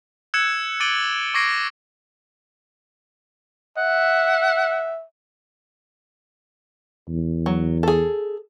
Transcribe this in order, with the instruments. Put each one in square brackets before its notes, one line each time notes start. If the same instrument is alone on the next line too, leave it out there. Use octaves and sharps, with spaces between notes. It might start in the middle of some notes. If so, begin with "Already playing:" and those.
[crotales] E6 F#6 G#6 C#7 E7
D6 A6 D7 D#7 F#7 G7
C#6 D6 G#6 A#6 C7 D7
[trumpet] E5 [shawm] F#5
[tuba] E2
[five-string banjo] F#3
G#4 A4